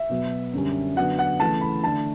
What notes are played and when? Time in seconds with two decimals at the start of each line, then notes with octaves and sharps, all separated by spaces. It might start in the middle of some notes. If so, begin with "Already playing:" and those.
Already playing: E5
0.10 B2 F#3 B3
0.53 F#2 D3 G3 C#4
0.96 D3 F#3 B3 D4 F#5
1.19 F#5
1.40 C#3 E3 A3 A5
1.61 B5
1.84 D3 A3 D4 A5